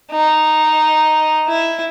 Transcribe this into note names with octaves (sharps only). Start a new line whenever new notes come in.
D#4
E4